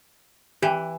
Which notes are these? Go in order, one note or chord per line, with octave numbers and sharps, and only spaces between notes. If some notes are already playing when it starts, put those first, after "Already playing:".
E3 G4